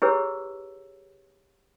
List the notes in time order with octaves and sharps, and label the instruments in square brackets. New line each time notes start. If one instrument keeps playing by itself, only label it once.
[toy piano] E4 G4 G#4 B4 C#5 E6